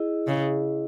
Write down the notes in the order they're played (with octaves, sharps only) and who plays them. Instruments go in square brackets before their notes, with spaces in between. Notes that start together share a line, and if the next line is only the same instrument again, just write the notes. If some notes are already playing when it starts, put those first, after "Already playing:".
Already playing: [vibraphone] E4 G#4 D#5
[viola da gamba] C#3